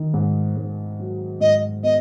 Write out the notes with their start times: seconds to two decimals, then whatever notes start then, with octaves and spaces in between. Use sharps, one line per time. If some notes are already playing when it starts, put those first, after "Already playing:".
Already playing: D#3
0.14 G#2
0.57 G#2
0.99 F#3
1.41 G#2 D#5
1.83 B3 D#5